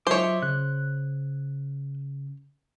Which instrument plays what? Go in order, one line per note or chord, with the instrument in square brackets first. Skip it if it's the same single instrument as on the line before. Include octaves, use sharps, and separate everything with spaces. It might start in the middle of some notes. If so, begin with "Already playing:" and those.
[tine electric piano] F#3 F4 D#5 [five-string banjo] C5 C#5 [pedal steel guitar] E5 D6
[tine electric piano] C#3 [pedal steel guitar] F#6